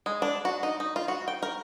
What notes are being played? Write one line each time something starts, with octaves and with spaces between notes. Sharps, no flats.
G#3
D4
F#4
D#4
D#4
F4
F#4
G5
A#4